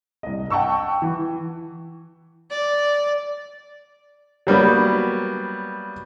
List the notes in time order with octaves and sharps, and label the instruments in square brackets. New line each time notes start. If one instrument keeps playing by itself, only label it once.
[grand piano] C2 D#5
F#5 G5 A5 C#6 E6
E3
[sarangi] D5
[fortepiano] F#3 G3 A#3 B3